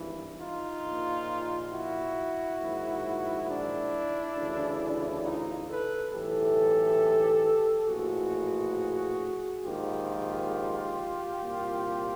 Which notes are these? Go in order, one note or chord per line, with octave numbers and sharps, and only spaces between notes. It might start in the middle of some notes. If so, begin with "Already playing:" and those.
Already playing: G#1 G2 E3
D#4 F4
A#1 A#2
E4 F#4
A#1 G#2 D#3
D4 E4
D2 C#3 E3
D#4 F4
A4 B4
B1 A2 E3 G4 A4
A#1 A2 E3 F#4 G#4
A#1 G#2 D#3 F4 G4
C2 A#2